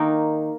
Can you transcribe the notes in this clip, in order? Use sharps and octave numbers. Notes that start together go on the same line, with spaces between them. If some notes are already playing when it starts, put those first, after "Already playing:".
Already playing: D#3 A#3 D#4 A#4